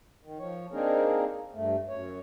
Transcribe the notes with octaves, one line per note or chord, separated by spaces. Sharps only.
D#3
F3 C#5
A#3 C4 D4 D#4 G#4 A#4
G2 A3
F#2 C#5